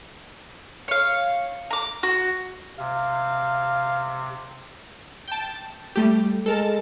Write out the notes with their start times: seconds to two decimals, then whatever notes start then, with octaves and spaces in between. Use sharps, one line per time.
0.88 C#5 F5
1.71 A#5 D6
2.03 F#4
2.79 C3 F5
5.28 G5 A5
5.96 G3 A3 G4
6.46 G#3 A4 A#4 A5